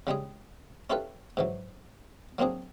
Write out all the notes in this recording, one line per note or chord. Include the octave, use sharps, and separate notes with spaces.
C#3 G3 G#3 G#4
C#4 E4 F4 G4 A4 B4
G#2 E3 F#3
F#3 A#3 C4 D4 G#4